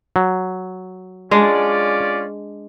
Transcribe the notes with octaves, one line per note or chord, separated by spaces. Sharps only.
F#3
G#3 C#4 D4 F4 D5